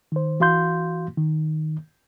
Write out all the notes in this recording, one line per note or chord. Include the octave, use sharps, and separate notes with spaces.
D#3 C5
E3 F#4 F5 C6 G6
D#3